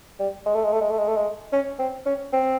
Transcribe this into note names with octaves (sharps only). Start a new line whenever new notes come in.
G3
G#3
A3
G#3
A3
G#3
A3
G#3
A3
G#3
C#4
C4
C#4
C4